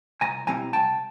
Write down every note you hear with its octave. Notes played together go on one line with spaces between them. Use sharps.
C2 G#5 A#5
B2 G3 C4 E4 G#5 A#5
C2 G5 A5